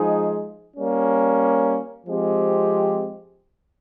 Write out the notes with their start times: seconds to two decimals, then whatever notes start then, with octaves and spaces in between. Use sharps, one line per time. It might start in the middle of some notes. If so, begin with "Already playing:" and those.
Already playing: F3 G#3 D#4 G#4
0.74 G3 A#3 C#4
2.06 F3 G#3 C4 G4